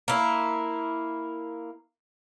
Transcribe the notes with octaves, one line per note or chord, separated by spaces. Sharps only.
A#3 E4